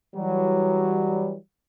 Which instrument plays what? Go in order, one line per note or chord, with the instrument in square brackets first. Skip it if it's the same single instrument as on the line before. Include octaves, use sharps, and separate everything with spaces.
[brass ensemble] E3 F#3 G3